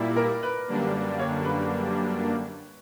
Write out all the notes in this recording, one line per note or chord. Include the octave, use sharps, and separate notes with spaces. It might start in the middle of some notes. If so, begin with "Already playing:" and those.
Already playing: A#2 G3 A#3 E4 D5
A#4
B4
F#2 D3 G3 A#3 D4
C#5
B4